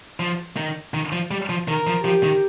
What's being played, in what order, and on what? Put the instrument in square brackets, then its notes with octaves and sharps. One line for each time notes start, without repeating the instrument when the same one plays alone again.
[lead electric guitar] F3
D#3
D#3
F3
G3
F3
[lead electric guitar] D#3 [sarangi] A#4
[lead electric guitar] F3
[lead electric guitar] F3 [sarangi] G4
[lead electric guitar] D#3